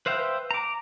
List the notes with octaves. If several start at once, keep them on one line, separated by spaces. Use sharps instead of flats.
B4 C5 E5 F5 G5
A#5 D6